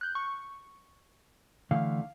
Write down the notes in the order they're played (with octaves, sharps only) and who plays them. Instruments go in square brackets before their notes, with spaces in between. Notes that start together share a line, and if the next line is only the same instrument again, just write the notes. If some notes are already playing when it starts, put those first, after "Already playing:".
[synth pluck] F#6 G6
C#6
[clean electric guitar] D3 E3 A3 [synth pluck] F5